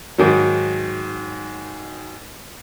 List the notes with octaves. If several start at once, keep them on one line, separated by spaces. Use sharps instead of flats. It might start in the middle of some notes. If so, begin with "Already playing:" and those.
G#2 D#3 F#3